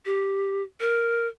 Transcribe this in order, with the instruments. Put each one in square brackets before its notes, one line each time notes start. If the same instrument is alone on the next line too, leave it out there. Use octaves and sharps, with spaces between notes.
[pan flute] G4
A#4